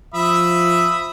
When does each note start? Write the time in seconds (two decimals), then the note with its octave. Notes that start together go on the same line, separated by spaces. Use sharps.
0.14 F3 E5 B5 D#6